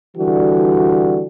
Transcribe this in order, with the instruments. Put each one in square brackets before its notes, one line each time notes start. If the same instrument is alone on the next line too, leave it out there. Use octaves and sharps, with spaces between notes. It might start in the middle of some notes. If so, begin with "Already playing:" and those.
[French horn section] D3 E3 G3 F#4